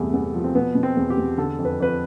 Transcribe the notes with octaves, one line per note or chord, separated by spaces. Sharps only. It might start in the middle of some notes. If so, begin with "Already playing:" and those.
Already playing: E2 G2 C3 A3
E2
F3
C4
B2 B3
B2
C4
E2
G4
E2
D3 A4
F2
B4
F2 B4